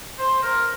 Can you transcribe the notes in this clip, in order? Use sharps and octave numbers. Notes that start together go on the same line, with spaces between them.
C5
A#4